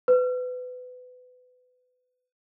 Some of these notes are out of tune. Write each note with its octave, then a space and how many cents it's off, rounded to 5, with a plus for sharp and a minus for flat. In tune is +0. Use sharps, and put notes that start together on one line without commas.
B4 +25